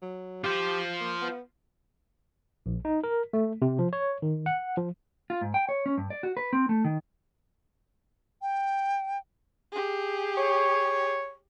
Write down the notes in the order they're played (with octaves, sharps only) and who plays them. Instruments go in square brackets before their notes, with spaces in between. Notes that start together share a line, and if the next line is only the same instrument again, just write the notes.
[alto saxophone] F#3
[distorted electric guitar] F4 C5 [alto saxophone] G4
[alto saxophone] A#3
B3
[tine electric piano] A#1
D#4
A#4
A3
C3
F3
C#5
D#3
F#5
F3
[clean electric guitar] F4
G#2
G5
C#5
C#4
G2
D5
F#4
B4
C4
A3
D#3
[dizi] G5
[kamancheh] G4 G#4
[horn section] C#5